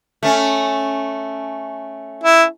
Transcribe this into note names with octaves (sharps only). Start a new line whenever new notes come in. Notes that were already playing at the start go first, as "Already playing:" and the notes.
A3 C#4
E4